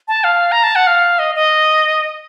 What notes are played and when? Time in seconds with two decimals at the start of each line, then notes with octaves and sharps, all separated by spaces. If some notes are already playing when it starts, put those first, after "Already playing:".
0.08 A5
0.24 F5
0.52 A#5
0.64 A5
0.76 F#5
0.87 F5
1.19 D#5
1.35 D#5